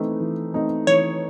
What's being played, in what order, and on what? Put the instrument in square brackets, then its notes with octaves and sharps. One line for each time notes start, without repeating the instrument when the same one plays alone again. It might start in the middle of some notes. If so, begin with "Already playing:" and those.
Already playing: [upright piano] E3 A3 C4 D#4
E3
A3 C4 D#4
[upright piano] E3 [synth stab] C#5